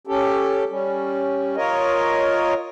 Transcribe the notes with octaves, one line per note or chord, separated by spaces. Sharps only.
C#4 G4 A4
G3 C#4
F4 A#4 C#5 D#5